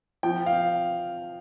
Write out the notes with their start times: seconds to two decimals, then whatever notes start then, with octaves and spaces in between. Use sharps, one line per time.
0.23 F3 G5
0.46 F5